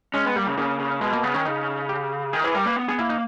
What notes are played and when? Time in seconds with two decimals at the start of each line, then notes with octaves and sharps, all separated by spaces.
0.14 G#3 C#4
0.25 B3
0.36 G3 A#3
0.46 C#3
0.57 C#3 A#3
0.79 C#3
1.01 B2 G#3
1.13 A#3
1.23 C#3 B3
1.34 D#3 C#4
1.45 C#3 D#4
1.89 G4
2.33 D#3 G#4
2.44 E3 G#4
2.55 G3 A#4
2.66 A#3 B4
2.76 B3
2.88 B3 G#4
2.99 A#3 E4
3.09 D#4